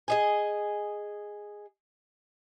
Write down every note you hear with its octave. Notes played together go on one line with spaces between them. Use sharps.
G#4 D#5 G#5